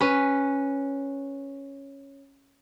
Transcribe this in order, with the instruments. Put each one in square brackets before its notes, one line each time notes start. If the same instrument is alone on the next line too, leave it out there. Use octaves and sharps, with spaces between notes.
[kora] C#4 B4